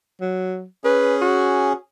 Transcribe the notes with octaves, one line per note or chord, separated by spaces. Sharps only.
F#3
C#4 G#4 B4
F#4